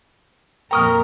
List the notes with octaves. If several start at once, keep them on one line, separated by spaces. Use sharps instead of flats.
F2 A#2 A#4 G5 A#5 C#6 D#6 F6